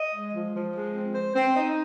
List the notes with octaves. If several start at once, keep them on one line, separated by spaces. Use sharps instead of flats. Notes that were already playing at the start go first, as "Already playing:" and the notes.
Already playing: D#5
G#3
F3
F3
G#3
C4
C5
C4
D#4